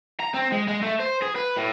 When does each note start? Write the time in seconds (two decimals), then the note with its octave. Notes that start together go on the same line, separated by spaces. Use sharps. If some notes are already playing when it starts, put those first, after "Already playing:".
0.20 A#5
0.34 C4
0.52 G#3
0.68 G#3
0.83 A3
1.00 C5
1.22 G#4
1.35 B4
1.57 A2